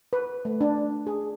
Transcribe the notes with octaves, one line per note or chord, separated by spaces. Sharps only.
B4
A3
D4
G#4